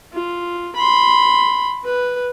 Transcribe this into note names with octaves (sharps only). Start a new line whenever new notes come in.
F4
B5 C6
B4